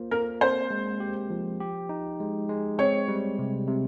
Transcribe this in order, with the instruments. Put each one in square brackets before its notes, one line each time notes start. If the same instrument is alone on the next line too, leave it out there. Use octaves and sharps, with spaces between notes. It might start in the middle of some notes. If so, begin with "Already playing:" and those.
Already playing: [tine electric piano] A#3 F4 C5
[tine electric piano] A#3 [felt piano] A#4
[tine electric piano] C4 [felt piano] C5
[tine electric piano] G#3
G4
F3
G4
D#4
G#3
G#3
[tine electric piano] C4 [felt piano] C#5
[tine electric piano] G3
C3
C3